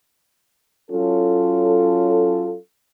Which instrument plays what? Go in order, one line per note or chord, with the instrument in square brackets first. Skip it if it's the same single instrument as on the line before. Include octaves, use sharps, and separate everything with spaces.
[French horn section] F#3 C#4 F4 A4